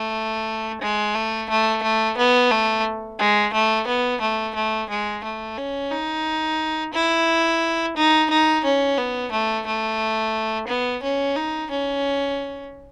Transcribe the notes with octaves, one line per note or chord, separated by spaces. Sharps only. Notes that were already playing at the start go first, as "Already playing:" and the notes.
Already playing: A3
G#3
A3
A3
A3
B3
A3
G#3
A3
B3
A3
A3
G#3
A3
C#4
D#4
E4
D#4
D#4
C#4
B3
A3
A3
B3
C#4
D#4
C#4